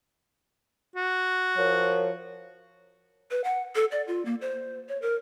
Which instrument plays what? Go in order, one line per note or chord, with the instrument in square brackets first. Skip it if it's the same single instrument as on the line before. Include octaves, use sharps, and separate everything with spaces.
[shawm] F#4
[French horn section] F3 A#4 C#5
[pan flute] B4
F#5
A4
D5
F4
A#3
C5
C#5
A#4